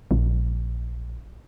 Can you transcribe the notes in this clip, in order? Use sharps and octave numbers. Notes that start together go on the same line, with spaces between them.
A#1